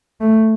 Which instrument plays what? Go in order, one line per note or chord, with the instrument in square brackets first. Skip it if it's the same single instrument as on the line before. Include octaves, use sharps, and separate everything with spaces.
[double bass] A3